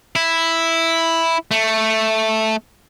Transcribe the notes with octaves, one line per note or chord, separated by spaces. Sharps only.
E4
A3